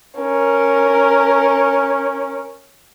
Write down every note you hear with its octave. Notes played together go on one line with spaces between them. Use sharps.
C#4 A#4